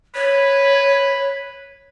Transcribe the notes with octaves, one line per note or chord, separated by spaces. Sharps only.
B4 C#5